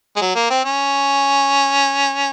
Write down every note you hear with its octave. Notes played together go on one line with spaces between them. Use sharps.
G#3
F#3
A#3
C4
C#4